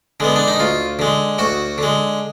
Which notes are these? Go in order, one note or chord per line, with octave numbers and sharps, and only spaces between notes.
D3 G#3 B3
D4
D#4
D2 F4
D3 G#3
D2 F#4
D3 G#3